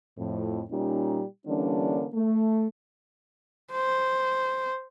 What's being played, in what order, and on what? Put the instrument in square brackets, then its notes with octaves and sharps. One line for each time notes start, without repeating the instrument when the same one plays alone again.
[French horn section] F2 A2
A#2 G3 C#4 D#4
D3 E3 G3 A#3 C#4 D4
A3
[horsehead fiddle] C5